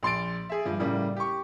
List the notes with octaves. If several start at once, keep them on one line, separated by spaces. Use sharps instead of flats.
A#1 C6 A6 D7
G#4 E5
G2 F3
A2 C#3 G3 A#3
G4 C#6